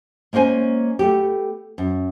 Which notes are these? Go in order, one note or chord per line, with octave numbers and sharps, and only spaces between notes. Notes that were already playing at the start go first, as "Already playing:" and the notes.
G#3 A#3 C#4 C5 G#5
A3 B3 G4
F#2